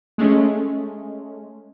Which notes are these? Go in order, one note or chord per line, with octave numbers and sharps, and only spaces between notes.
G#3 A3 C#4